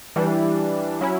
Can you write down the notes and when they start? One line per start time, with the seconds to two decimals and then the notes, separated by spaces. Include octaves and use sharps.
0.16 E3 G3 D4
1.01 F#3 C#4 E4